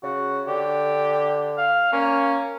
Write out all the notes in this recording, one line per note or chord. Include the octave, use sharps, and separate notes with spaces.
C#3 F#4
D3 G4
F5
A#3 C#4